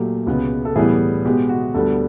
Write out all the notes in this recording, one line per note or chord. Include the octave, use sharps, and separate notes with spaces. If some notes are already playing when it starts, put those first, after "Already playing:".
Already playing: A#2 F#3 A3 G4
C#2 B2 G#3 B3
A4
A2 E3 G3 B3 G#4
B2 G#3 B3 G4
F#4
D2 D3 G3 B3 A4